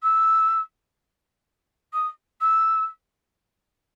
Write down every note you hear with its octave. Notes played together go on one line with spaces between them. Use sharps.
E6
D#6
E6